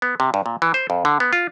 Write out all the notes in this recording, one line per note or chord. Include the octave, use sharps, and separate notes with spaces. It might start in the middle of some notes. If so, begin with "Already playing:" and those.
B3
C3
G2
A#2
E3
C5
F2
D3
B3
F4